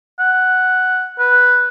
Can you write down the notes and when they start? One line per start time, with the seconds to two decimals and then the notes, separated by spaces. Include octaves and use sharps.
0.19 F#5
1.19 B4